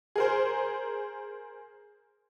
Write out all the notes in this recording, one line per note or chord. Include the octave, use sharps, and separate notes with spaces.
G#4 A#4 C5